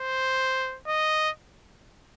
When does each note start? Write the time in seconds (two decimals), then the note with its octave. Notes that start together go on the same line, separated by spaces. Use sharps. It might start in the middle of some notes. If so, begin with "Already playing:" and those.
Already playing: C5
0.87 D#5